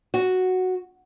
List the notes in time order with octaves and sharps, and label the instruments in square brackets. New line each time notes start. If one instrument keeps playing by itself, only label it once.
[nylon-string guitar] F#4